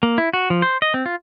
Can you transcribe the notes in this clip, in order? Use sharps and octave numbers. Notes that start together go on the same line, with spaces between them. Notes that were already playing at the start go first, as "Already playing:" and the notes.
A#3
E4
F#4
F3
C5
D#5
C4
F4